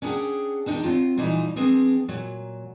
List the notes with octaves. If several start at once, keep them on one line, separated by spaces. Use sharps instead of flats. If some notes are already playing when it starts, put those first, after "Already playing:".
C#4 D4 G#4 B4 F#5 G5
E2 D4 D#4 E5 G5 A5
F#3 C4 F4
A#2 E3 F3 G3 D#4
F3 B3 C4 D4 G#4
A#2 F#3